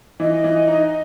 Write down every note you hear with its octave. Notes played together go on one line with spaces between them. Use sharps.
E3 D#5
E3
D#4